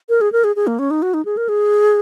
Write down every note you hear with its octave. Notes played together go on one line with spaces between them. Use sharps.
A#4
G#4
A#4
G#4
G#4
A#3
C#4
D#4
F#4
D#4
G#4
A#4
G#4